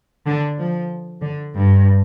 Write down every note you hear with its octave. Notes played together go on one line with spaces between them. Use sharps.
D3
F3
D3
G2